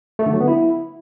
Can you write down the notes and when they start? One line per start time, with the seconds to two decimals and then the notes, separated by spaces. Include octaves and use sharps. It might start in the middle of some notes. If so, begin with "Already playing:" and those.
0.19 A3
0.26 D3
0.33 F#3
0.40 B3
0.48 E4